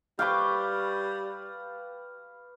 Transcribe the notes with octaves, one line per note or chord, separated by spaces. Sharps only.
G3 B4 F5 G5 C#6 D6